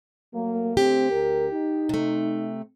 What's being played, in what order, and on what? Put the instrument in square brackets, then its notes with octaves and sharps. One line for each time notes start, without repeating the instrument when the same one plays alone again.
[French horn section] F#3 A3 A#3
[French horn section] D3 A3 C4 [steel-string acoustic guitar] G4
[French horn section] D2 A#4
D#4
[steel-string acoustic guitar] C3 A3